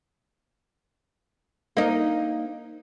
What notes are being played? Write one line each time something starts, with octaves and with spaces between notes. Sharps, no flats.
A#3 D#4